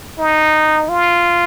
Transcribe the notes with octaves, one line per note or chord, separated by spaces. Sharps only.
D#4
F4